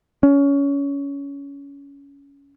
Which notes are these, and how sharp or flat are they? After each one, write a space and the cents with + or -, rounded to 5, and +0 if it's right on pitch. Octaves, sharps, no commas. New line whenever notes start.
C#4 +20